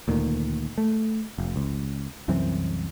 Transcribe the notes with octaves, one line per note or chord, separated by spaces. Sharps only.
D2 A#2 D#3
A3
F1
C#2
C2 F#2 E3 C4